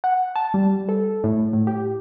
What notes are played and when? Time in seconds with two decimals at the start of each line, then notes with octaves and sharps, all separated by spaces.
0.04 F#5
0.36 A5
0.54 G3
0.89 A4
1.24 A2
1.53 A2
1.67 G4